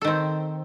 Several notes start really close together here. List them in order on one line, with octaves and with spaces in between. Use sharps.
A4 D#3 C4